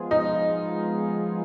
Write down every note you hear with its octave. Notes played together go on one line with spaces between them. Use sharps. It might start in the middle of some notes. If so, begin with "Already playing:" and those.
Already playing: F3 G#3 B3 F4 G#4
D#4